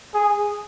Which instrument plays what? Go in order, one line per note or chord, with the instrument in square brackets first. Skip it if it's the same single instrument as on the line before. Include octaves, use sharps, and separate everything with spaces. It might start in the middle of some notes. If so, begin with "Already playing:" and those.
[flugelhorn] G#4